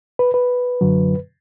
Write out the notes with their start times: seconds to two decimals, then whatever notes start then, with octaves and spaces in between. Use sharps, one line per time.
0.19 B4
0.34 B4
0.81 F#2 D3 F#3